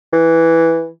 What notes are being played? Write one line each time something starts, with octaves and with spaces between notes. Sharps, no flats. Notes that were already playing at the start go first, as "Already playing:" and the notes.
E3